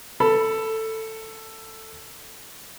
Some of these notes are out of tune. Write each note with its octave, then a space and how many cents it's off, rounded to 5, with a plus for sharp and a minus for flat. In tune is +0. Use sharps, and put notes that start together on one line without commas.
A4 +10 B5 +0